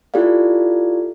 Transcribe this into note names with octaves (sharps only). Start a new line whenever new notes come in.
E4 F4 G4 A4 D5 F5